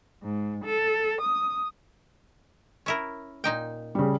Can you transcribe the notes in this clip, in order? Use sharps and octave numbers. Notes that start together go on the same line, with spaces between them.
G#2
A4
D#6
C#4 E4 A#4
A#2 D#4 G5
C#3 G3